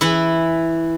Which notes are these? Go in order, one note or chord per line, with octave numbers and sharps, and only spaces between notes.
E3 E4